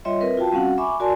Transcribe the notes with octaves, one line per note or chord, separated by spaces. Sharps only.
G3 F4 C#5 D#5 E5 C6
C4 A#4 B4 E5
F4 F#4 F5 G5 A5
G3 C4 C#4 F#4 F5 F#5
E5 G#5 B5 C#6 D6
F#4 A#4 D5 G#5 A5 C6